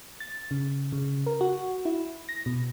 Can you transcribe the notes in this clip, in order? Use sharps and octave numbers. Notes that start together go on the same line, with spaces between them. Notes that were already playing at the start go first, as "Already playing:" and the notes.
A6
C#3
C#3
A#4
F#4
E4
A#6
B2